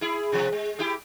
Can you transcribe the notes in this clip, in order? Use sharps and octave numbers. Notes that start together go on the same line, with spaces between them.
E4 G#4
C3 F3
G#3
E4 G4 G#4